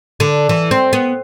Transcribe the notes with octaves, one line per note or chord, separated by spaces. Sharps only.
D3
E3
C4
B3